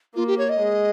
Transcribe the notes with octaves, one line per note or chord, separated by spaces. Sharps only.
A#3 F4
G4
C#5
D#5
G#3